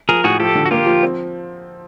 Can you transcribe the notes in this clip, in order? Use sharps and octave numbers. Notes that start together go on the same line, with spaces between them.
F3 G#4 A#4
A2 F#4 G#4
F3 G4 A4
D3
F#4
A#3 F4 G4
F3
C4